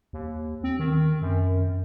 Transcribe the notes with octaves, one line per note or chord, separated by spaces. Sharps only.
D#2
C4
D#3
F#2